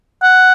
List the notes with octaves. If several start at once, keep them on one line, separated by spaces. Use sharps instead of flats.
F#5